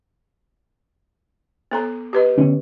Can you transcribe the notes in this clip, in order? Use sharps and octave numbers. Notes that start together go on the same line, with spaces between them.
B3 A4 A#5
G4 B4 D#5
D3 B3 C#4